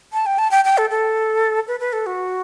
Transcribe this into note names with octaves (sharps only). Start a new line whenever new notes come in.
A5
G5
A5
G5
G5
A4
A4
B4
B4
A4
F#4